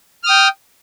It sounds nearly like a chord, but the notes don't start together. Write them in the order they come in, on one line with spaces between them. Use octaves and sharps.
F6 D#6 G5